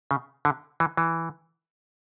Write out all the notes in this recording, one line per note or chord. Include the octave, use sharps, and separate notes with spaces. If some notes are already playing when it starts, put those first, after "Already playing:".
C#3
D3
E3
E3